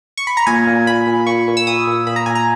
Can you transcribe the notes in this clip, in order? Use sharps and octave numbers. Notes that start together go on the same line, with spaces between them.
C#6
B5
A#5
A#2 G#5
A#2
A#2 B5
A#2
A#2 C#6
A#2
E6
A#2 D#6
A#2
A#2 B5
A#5
A#2 G#5
A#5